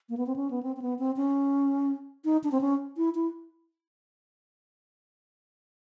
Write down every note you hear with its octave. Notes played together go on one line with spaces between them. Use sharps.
A#3
B3
C4
C#4
B3
C4
C4
B3
C4
C#4
D#4
D4
C4
C#4
E4
E4